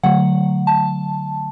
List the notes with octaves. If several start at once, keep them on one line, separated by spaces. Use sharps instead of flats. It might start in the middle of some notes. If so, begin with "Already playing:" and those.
D3 F#3 A3 F#5
A5